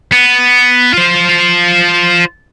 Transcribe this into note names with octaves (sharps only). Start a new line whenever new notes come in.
B3
F4 C5